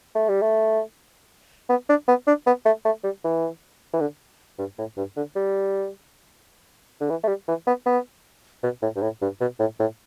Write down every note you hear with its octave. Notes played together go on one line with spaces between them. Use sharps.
A3
G3
A3
B3
D4
B3
D4
B3
A3
A3
G3
E3
E3
D3
G2
A2
G2
D3
G3
D3
E3
A3
G3
E3
B3
B3
B2
A2
G2
A2
G2
B2
A2
A2